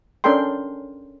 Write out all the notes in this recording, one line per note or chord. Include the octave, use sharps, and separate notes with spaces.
C#4 D4 A4 A#4 G5 C6